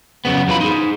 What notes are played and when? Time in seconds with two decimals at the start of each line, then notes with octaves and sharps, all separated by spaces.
0.25 F#2 C#3 B3
0.48 F#2 E3 F4 B5
0.61 D#4 G#4